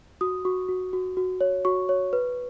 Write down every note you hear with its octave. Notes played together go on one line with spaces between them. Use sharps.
F#4 D#6
F#4 C#6
F#4
F#4
F#4
C#5
F#4 C#6
C#5
B4